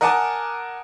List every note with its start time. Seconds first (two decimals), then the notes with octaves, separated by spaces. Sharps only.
0.01 A#4 D#5 F#5 G#5 A5 D6